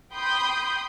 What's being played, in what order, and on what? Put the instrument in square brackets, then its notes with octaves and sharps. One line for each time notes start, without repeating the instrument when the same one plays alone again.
[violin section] G5 B5 C6 D#6 G6